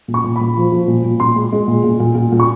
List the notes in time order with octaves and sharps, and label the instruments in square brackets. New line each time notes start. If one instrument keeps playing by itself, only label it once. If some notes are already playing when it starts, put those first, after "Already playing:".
[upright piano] A#2
C#6
A#2
B5
A#2
F3
F3
A#2
A#2
A#2 C6
G#3
G#3
A#2
A#2
A#2
A#2
A#2
C#6